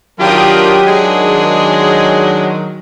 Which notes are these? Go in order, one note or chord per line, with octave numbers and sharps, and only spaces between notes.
D#3 F#3 D4 F4 G4 A#4 G5 D#6
G#3 D4 G#4